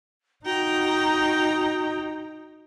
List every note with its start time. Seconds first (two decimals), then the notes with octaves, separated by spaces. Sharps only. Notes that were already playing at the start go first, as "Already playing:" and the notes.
0.45 D#4 F#4 G5 A#5